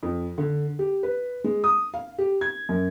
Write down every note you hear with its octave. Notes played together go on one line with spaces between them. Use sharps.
F2
D3
G4
B4
G#3
D#6
F5
G4
G#6
F#2